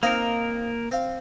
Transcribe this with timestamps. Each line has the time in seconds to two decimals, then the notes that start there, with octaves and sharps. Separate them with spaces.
0.03 A#3 C4 D#4 F4 A#4
0.91 C4 F5